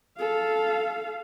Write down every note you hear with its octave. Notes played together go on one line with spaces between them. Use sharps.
A4 F5